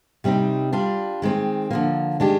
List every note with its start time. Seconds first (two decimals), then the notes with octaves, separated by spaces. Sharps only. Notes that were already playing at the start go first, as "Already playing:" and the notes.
0.24 C3 G3 C4 D#4
0.73 G3 D4 F4
1.22 D#3 G#3 C4
1.71 D3 F3 A#3
2.20 D#3 G#3 D4 G4